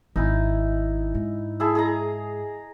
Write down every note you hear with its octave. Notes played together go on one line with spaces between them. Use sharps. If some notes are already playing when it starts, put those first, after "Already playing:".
G#1 D#4 E4 G#5
G#2
E4 G#4 A4
G#4 D#5 A#5